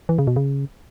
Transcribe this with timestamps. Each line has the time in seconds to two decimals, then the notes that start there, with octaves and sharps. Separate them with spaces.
0.09 E3
0.19 C#3
0.27 B2
0.36 C#3